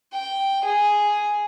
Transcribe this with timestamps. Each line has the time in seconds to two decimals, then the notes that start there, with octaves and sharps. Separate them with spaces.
0.13 G5
0.64 G#4